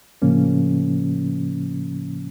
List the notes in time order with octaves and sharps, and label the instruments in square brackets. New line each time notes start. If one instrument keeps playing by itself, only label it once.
[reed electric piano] A2 C#3 F3 A#3 C#4